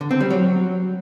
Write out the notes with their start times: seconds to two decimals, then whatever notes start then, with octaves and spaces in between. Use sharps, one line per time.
0.01 D3
0.11 C4
0.21 G3
0.30 F#3